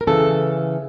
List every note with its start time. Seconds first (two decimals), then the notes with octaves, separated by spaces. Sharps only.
0.01 A#4
0.07 C#3 E3 A4